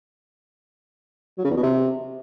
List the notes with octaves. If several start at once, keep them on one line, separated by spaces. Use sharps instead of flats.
F#3
C#3
E2
B2
C3